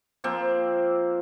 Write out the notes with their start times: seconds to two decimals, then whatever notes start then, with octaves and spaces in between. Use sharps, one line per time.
0.24 F3 A#3 C4